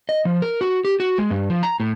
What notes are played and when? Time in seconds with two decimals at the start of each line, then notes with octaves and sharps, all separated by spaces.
0.09 D#5
0.25 F3
0.42 A#4
0.61 F#4
0.85 G4
1.00 F#4
1.18 G#3
1.30 G2
1.50 F3
1.63 A#5
1.80 A2